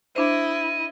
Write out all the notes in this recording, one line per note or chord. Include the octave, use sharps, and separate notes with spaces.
D4 E4 C5 D#5